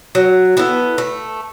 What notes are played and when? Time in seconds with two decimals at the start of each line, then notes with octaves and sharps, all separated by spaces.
0.15 F#3
0.57 B3 E4 A4
0.98 A3